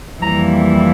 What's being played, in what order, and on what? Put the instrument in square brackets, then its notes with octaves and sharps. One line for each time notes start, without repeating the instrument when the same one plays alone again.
[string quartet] F2 E3 G3 A#3 E4 A#5